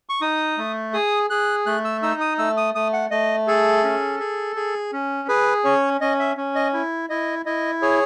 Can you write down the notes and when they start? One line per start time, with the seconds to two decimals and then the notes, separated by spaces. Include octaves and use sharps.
0.09 C#6
0.21 D#4 D#6
0.58 A3
0.94 G#4 D#6
1.30 G#4 F#6
1.66 A3 F#6
1.84 E6
2.03 D#4 E6
2.21 D#6
2.38 A3 E6
2.57 D#6
2.75 A3 D#6
2.93 F#5
3.11 A3 D#5
3.47 G#4 A4
3.84 C#4
4.20 G#4
4.56 G#4
4.92 C#4
5.28 G#4 B4
5.64 C#4 C#5
6.01 C#4 D#5
6.19 E5
6.37 C#4
6.55 D#5
6.73 E4
7.09 E4 D#5
7.46 E4 D#5
7.82 G#4 C#5